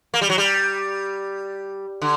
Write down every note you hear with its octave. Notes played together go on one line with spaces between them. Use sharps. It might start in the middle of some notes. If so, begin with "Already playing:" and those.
A#3
G3
F#3
G3
D3